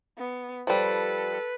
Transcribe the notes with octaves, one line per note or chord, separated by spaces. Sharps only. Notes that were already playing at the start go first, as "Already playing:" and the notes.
B3
F3 G3 A4 B4